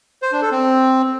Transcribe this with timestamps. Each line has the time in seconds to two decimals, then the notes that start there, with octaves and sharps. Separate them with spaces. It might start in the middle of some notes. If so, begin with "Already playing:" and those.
0.22 C5
0.32 D4
0.42 A4
0.52 C4